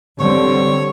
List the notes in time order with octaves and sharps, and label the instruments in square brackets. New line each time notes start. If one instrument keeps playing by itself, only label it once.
[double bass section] D3 G3 C4 [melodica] C#5